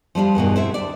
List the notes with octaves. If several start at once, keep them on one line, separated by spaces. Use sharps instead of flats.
F3 G3 D4 F4
E2 G2 B2 D#3
C4 E4 A4 E5
D2 D5